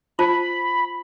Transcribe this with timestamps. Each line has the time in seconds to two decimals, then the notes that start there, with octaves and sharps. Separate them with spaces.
0.19 F4 C5 A5 B5